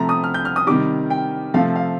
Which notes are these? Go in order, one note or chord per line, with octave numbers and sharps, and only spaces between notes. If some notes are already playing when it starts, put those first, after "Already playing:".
Already playing: C3 F3 A3 A#5
D#6
F6
G6
F6
D#6
C3 D#3 G3 D6
G5
C3 F3 A3 F5
F5